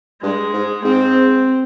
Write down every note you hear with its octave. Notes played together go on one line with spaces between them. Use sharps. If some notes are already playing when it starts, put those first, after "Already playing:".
G2 G#3
G#2
G#2 C4